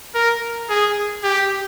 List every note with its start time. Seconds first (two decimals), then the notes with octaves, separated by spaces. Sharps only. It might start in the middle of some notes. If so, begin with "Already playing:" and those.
0.15 A#4
0.69 G#4
1.23 G4